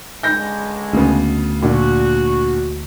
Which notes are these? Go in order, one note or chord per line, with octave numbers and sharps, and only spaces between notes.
C#2 D3 G#3 G6 A#6
D2 C#3 B3
A#2 D3 F#4